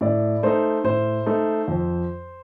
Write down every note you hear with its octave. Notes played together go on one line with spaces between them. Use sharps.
A2 D5
A3 D#4 C5
A2 C5
A3 D#4
F2